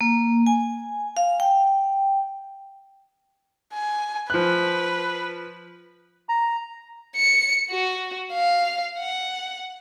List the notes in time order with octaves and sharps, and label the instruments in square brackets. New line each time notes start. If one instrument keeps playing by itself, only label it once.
[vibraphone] A#3
G#5
F5
G5
[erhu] G#5
[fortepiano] F3 F#6 [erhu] B4
[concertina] A#5
[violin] C#7
F#4
F5
F#5